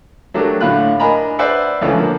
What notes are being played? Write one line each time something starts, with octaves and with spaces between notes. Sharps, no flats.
F#3 A3 D4 G4 A#4
A2 D3 F4 B5 F#6
D4 A#4 D#5 G#5 A#5 B5
B4 C5 D5 E5 F#5
C#2 E3 F3 A3 C#4
D3 F3 A#3